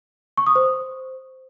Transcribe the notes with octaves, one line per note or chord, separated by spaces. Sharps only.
C#6
D#6
C5